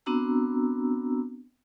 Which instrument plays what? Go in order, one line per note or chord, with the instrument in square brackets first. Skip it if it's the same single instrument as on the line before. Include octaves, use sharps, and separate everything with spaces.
[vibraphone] B3 C4 D4 F#4 A#5 E6